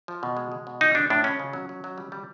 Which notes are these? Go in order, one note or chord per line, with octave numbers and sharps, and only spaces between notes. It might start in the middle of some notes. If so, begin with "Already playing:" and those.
F3
B2
G#3
G#3
B2
E3 D#4
G#3 D4
A2 D4
G#3 C#4
C#3
F#3
F#3
F#3
G3
G3